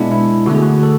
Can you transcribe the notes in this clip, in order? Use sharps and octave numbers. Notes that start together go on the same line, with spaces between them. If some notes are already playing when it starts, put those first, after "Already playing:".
Already playing: B2 G#3 B3 D4 E4
E4
D3 A3 F#4
G#4
F#4
A4